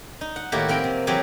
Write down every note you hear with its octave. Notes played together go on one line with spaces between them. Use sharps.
D#4
F#5
A2 D#3 A#3 E4 F#4 G4
F3 C4 A#4 G5
C3
E3 F#3 C4 G4 G#4 C#5